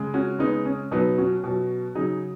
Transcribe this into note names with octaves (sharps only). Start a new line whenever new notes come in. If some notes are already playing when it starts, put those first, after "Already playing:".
Already playing: C#3 G#3
C#4 F#4
C#3 G#3 B3 D#4
C#4
B2 F#3 B3 D#4
C#4 F#4
B2 F#3
C#3 F#3 D#4 G#4